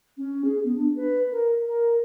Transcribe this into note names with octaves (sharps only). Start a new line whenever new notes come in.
C#4
G#4
B3
D4
B4
A#4
A#4